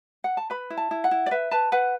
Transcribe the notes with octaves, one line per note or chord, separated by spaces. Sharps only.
F#5
A5
B4 B5
E4
A5
E4
F#5
E4
D5
B4 E5
B4 A5
B4 F#5